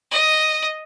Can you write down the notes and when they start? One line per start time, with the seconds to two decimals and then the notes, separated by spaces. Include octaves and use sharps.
0.11 D#5